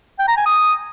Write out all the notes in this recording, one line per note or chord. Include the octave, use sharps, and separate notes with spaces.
G5
A#5
G#5
D#6